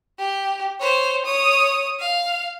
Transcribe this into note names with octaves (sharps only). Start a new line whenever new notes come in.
G4
C5 C#5
C#5 D#6
F5